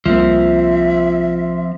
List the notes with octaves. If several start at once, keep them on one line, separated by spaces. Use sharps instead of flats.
C2 F3 A#3 C4 E5